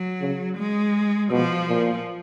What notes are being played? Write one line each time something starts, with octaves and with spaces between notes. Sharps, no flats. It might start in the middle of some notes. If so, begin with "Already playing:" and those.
Already playing: F#3
C#3
G#3
B2 F3
A#2